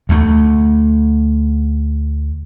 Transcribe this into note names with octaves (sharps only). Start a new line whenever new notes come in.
D2 A3